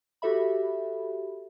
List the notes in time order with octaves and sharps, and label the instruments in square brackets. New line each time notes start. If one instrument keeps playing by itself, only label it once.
[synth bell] F#4 G4 A4 E5 B5